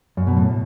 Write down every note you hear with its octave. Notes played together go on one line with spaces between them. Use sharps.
F#2
B2
A2